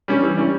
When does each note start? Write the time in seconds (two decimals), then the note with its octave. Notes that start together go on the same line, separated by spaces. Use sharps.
0.08 G3 C#4
0.23 E3
0.37 G3 C#4